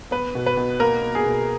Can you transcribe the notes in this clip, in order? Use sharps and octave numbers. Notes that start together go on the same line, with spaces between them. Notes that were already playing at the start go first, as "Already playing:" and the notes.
B3 B4
B2
B4
B2
A#3 A#4
A#3
G#4
B2